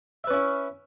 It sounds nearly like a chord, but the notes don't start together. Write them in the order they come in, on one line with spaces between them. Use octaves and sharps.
E5 B4 C#4 E4